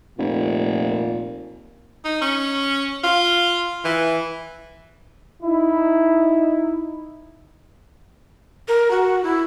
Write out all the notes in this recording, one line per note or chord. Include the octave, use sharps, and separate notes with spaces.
F1 A#2
D#4
C#4
F4
E3
D#4 E4
A#4
F#4
E4